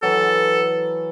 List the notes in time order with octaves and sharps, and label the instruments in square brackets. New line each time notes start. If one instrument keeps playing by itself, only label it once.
[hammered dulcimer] E3 F#3 [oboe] A4